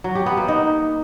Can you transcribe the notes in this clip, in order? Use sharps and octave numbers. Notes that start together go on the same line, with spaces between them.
F#3
G4
B3
A#3
D#4